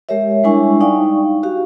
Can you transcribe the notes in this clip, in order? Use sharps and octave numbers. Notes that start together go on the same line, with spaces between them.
G#3 G4 A#4 C#5 E5
G3 G#3 D4 E4 G#5 C#6
D#4 D5 F5 G5 C#6
F#4 G4 F5